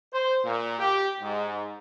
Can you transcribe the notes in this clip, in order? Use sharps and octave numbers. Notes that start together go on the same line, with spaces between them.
C5
A#2
G4
G#2